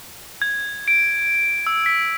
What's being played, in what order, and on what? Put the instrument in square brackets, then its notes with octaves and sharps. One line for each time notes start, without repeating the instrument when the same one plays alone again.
[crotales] G#6
D7
E6
B6